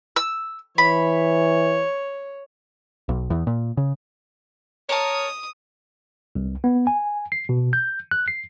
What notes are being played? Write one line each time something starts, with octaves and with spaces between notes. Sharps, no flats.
E6
E3 C#5 B5
B1
E2
A#2
C#3
A#4 C#5 A5 D#6
C2
B3
G#5
C7
B2
G6
F#6
C7